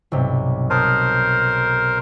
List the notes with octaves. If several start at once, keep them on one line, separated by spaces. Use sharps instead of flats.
B1 G2 C3
A#4 C5 A5 D#6 F#6